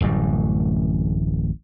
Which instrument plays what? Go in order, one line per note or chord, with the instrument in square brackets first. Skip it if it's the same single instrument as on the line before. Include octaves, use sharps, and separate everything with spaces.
[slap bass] D1 A1 F#2 G3